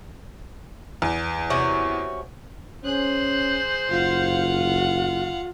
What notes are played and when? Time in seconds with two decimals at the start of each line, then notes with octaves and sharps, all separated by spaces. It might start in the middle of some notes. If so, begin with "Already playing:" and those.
1.02 E2
1.50 C3 C#4 F#4
2.84 C#4 G#4 C5 F#6
3.89 F#1 F4 F5 F#5